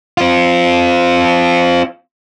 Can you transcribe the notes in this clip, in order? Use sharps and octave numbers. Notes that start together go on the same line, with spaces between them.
C4 F4